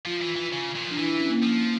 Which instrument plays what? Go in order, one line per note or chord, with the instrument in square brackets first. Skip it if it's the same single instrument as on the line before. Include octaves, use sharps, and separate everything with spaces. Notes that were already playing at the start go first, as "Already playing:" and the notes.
[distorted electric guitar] F3 [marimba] F4
[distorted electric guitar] E3
E3
C#3
A#2
F3
[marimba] D4
[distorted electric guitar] E3 [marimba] E4
[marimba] C#4
A#3
[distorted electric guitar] F3 [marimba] C#4